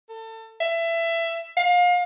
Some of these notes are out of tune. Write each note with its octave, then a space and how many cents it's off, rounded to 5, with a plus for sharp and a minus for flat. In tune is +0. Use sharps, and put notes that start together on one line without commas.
A4 +30
E5 +20
F5 +30